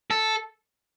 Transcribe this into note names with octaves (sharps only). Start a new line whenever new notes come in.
A4